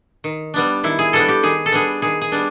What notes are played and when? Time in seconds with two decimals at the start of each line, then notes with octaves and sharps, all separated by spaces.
0.24 D#3
0.54 G3 B3 D4
0.84 D#3 E4
0.99 G#4
1.13 G3 B3 D4 A4
1.28 G4
1.43 D#3 G#4
1.66 A4
1.72 G3 B3 D4 G#4
2.02 D#3 G#4
2.21 G#4
2.32 G3 B3 D4